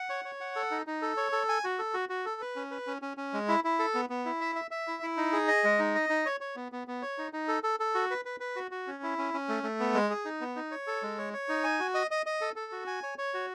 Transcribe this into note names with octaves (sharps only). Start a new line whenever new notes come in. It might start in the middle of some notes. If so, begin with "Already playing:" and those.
Already playing: F#5
C#5
C#5
F#5
A4
D#4
D#4
A4
C#5
A4
G#5
F#4
A4
F#4
F#4
A4
B4
C#4
B4
C#4
C#4
C#4
G#3
E4
E4
A4
B3
B3
E4
E5
E5
E5
E4
E4
D#4
G#4
D#5
G#3
D#4
D#5
D#4
C#5
C#5
B3
B3
B3
C#5
D#4
D#4
A4
A4
A4
F#4
B4
B4
B4
F#4
F#4
C#4
E4
C#4
C#4
A3
A3
B3
G#3
G#4
D#4
B3
D#4
C#5
A4
G#3
C#5
C#5
D#4
G#5
F#4
D#5
D#5
D#5
A4
A4
F#4
G#5
C#5
C#5
F#4